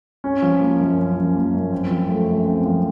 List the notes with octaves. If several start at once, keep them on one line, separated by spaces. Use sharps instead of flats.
C#4
F3
A#3
F#2
C#4
F3
A#3
F#2
C4
F3
A3
F#2
C4
F3